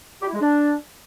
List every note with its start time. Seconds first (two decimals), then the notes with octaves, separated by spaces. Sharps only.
0.21 G4
0.27 E4
0.34 G#3
0.40 D4